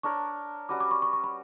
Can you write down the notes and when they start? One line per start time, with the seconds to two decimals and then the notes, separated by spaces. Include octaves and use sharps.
0.03 D4 A#4 C#5 C#6
0.69 G3 C#4 F#4 B4 D6
0.80 D6
0.91 C#6
1.02 C#6
1.13 C#6
1.24 B5